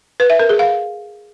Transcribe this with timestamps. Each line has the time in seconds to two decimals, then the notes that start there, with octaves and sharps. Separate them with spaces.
0.20 B4
0.30 E5
0.39 A#4
0.49 G#4
0.59 F5